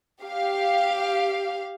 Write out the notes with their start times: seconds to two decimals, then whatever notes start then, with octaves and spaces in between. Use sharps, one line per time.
0.21 G4 F5